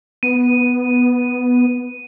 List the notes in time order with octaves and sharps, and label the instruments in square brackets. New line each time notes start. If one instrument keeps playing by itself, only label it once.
[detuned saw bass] B3 [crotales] D#7